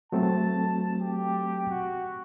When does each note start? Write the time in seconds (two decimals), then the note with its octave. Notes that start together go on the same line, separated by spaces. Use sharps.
0.12 F#3 A3 C4 A5
1.02 G4
1.70 F#4